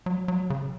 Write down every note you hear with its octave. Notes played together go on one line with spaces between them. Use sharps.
F#3
F#3
C#3